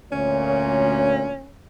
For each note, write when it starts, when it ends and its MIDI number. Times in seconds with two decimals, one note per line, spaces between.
0.12 1.33 38
0.12 1.33 46
0.12 1.50 61
0.12 1.33 73